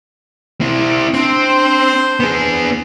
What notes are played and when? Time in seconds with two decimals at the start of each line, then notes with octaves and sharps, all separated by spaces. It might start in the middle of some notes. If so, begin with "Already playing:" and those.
0.61 C4 E4
1.14 C4 D4 C5
2.20 B3 G#4